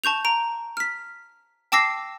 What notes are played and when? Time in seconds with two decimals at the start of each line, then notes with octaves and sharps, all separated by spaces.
0.04 A5 C#6 G6 F7
0.25 A#5 D7
0.77 F6 B6
1.72 G5 A5 D6 E6 A#6 C7